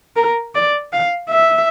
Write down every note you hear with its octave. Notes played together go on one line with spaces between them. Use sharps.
A#4
D5
F5
E5